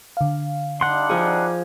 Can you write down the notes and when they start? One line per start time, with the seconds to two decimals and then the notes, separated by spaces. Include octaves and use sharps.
0.17 D3 F5
0.81 G3 D4 D#4 F#5 C6
1.10 F3 G#4